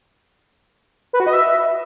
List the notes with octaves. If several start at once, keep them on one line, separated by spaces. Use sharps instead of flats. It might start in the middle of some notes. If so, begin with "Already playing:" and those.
B4
F#4
D#5
E5